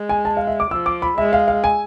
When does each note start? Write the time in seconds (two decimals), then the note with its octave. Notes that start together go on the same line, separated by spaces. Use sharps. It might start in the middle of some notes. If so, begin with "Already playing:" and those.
Already playing: G#3
0.09 G#5
0.25 A5
0.37 F5
0.47 E5
0.60 D6
0.71 F3 E6
0.86 D6
1.02 B5
1.18 G#3 E5
1.33 F5
1.48 F5
1.64 G#5